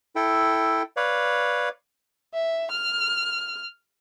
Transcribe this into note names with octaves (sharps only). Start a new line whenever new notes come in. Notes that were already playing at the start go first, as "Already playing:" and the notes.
E4 A4 G5
B4 C#5 D5 F5
E5
F6